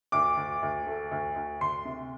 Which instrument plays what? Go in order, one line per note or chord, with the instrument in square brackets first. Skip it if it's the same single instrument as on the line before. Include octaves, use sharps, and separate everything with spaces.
[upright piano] D2 D6
D2
D2
A3
D2
D2
D2 C6
C3